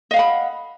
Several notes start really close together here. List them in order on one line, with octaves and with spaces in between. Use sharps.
D#5 F5 F#5 B5